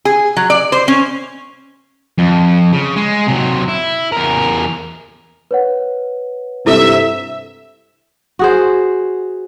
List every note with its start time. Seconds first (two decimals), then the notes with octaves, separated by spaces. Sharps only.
0.05 G#4
0.37 F#3
0.50 D5
0.72 C5
0.88 C#4
2.18 F2
2.73 C#3
2.96 G#3
3.28 C3 F#3
3.68 E4
4.12 E2 A#4
5.51 B4 C#5 F#5
6.66 G2 C3 E4 A4 E5
8.39 F#4 G#4 C5